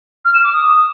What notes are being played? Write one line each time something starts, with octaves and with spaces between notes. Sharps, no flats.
F6
E7
D6
D#6